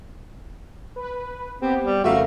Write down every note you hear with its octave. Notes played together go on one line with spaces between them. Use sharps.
B4
B3 C4 G4
G3
F2 C#3 A3 F#4 A#4 E5 F5